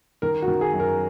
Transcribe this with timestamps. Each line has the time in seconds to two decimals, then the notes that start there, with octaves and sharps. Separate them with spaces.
0.22 D#3 A#4
0.42 F#4
0.48 D#3
0.61 G#4
0.73 F#2
0.80 A#4